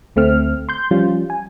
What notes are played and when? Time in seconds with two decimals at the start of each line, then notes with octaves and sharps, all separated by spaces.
0.16 D2 A3 C4 F6
0.69 C6 G6
0.91 F3 G3 C#4 F4
1.30 G#5